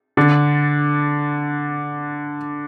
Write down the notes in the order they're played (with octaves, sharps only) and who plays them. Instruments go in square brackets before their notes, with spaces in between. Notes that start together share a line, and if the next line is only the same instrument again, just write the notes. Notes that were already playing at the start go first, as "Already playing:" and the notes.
[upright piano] D3 D4